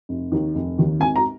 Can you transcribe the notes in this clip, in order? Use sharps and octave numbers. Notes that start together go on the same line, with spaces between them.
F1
D#2 D#3
F1
D#2 D#3
G#1 G#5
A#5